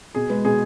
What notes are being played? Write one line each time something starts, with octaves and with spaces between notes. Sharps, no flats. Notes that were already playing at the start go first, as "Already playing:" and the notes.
B2 G#4
G#3 B4
B2 G#4